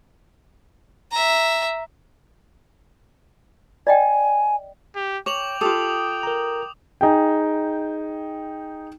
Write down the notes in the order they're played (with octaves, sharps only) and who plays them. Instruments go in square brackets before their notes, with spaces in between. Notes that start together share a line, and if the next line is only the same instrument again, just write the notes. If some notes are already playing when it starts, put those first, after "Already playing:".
[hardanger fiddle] E5 A#5
[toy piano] D5 D#5 G5 [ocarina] G#5
[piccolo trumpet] G4
[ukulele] C#5 [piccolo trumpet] G5 [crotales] D6 F7 F#7
[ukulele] F4 G4 A4 [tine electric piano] D6 [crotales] D#6
[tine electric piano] A#4 A#5
[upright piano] D#4 G#4 G5